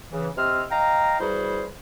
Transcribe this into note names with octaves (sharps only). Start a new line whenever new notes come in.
C#3 E3
C3 D#5 C6 E6 F6
D#5 F5 G5 A#5
E3 G3 E4 F#4 G#4 C5